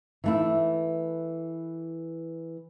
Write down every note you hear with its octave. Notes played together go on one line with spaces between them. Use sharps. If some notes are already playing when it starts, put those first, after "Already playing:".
E3 A3 E4